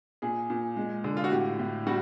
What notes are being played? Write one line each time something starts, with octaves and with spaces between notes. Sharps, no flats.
A#2 G#4
A#2
G#3
D3
F4
F#4
A2 G4
A2
G3 F#4